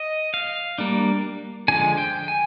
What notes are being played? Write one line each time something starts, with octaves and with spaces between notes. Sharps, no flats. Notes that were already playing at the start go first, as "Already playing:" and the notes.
Already playing: D#5
F5
G3 A#3 D4
D3 F3 G#3 G#5
G5
G#5